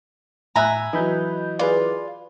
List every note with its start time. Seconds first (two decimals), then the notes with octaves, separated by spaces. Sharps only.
0.56 A2 E5 G#5 A#5 B5 E6 F#6
0.93 E3 F#3 D#5 B5 G6
1.59 F4 G#4 B4 D5